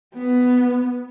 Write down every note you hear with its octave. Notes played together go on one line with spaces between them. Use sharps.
B3